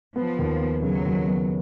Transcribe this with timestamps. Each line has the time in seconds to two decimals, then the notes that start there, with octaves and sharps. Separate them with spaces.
0.16 F3 B3
0.39 D#2
0.61 B3
0.83 C#3 F#3
1.05 D#2
1.27 B3